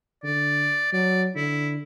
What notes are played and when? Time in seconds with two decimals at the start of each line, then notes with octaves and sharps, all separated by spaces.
0.24 D3 D5
0.93 F#3 D5
1.36 D3 E4